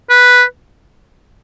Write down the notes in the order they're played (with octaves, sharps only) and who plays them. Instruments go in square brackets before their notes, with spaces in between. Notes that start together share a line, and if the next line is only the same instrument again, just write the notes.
[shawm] B4